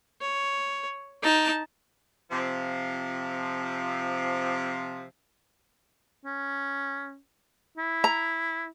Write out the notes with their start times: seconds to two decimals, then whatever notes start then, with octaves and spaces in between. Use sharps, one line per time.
0.21 C#5
1.23 D#4 A5
2.31 C3 F3
6.25 C#4
7.78 E4
8.04 A#5